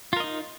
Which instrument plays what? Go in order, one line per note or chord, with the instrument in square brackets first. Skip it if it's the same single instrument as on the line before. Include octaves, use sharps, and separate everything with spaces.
[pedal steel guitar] F4
A#4
D#5
D#4